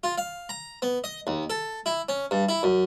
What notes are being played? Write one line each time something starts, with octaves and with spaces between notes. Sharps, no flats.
F4
F5
A#5
B3
D#5
D#2
A4
E4
C#4
G2
E4
F#2